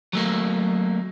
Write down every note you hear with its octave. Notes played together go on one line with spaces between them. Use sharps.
F#3 A3 A#3